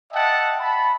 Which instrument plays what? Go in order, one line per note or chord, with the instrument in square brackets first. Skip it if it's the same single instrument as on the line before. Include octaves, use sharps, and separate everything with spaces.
[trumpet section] D#5 E5 F#5 G5 A5
A5 B5